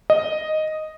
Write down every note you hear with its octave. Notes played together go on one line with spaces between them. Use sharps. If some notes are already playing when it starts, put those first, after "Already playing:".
D#5